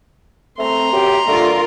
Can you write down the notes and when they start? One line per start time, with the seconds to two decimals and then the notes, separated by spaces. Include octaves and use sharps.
0.59 A3 C4 A#5 C6
0.93 F#2 G4
1.28 D3 A3 F4 A#4